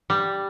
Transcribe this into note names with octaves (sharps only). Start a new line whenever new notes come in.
G3